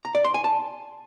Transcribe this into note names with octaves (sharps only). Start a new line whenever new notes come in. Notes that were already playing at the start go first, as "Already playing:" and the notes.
A#5
D5
C6
G#5
A5